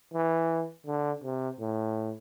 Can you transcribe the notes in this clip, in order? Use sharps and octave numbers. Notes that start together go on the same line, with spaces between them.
E3
D3
C3
A2